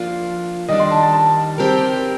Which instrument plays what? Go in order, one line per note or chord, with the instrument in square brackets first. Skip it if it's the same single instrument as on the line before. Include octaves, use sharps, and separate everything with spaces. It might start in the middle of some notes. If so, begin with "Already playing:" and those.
Already playing: [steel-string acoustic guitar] F3 A#3 D4 F4
[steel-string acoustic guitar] D#3 G3 D4 [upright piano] D#5
[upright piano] C6
A5
A5
A5
[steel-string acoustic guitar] G3 C4 G4 A#4